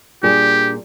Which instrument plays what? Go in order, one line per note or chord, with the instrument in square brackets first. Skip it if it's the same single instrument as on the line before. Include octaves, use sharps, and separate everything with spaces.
[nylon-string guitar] A#2 G3 D4 G#4 [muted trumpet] G4